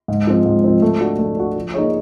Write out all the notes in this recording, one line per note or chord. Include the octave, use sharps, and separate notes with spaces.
G#2
F3 G#3 C4
G#2
F3 G#3 C4
A3
D4 F#4
A3
D4 F#4
F3
A#3 D#4 G#4 C#5